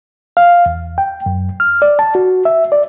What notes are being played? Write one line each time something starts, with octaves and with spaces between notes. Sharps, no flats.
F5
E2
G5
F#2
F6
D5
A5
F#4
E5
D5